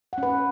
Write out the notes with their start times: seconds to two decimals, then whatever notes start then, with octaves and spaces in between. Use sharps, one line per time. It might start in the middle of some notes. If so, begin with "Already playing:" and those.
0.13 F#5
0.18 C#4
0.23 B4